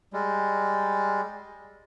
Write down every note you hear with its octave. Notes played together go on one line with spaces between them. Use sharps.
G3 G#3